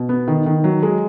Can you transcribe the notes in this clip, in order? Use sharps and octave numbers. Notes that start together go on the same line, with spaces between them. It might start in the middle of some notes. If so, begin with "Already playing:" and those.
Already playing: B2
B3
D#3
D#3
F#3
G#3